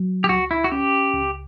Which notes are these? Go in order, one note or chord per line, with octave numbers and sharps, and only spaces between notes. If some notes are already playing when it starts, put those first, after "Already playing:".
Already playing: F#3
G4
C#2 F#4
E4
F#4
C#4 G4
C#2